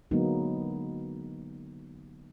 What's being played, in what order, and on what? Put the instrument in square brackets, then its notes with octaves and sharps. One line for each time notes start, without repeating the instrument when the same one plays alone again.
[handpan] D3 F#3 G#3 A#3 B3 D#4